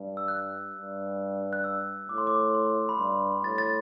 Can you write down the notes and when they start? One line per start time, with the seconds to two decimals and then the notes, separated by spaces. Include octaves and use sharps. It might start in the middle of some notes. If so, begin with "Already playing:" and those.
Already playing: G2
0.17 E6
0.28 F#6
0.73 G2
1.53 F#6
1.64 E6
2.09 A2 D6
2.18 C6
2.27 D6
2.54 C6
2.89 B5
2.98 G2 C6
3.44 A2 A6
3.58 A6